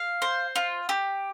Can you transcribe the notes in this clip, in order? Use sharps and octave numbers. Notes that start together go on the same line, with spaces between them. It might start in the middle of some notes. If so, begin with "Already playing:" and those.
Already playing: F5
C5
F4
G4